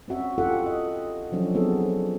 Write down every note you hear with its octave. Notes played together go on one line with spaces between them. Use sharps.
C4 C#4 F#4 E5
E4 F4 G4 A4 E5 F#5
D#5
F3 F#3 C#4 D4 A4
B3 C4 E4 F#4 G#4 A4